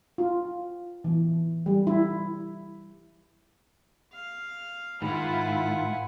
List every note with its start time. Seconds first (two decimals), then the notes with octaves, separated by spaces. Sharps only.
0.18 F4
1.04 E3
1.66 G3
1.87 E4
4.13 F5
5.02 G#2 D#3 E4 F4 F#5 G#5